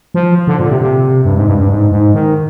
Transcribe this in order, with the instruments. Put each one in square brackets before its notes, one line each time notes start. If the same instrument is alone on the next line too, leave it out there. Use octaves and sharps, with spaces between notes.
[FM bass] F3
D3
A#2
C3
C3
G2
G#2
G2
G2
G#2
G#2
D#3